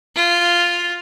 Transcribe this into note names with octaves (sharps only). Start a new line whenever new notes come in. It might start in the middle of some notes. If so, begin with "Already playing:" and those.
F4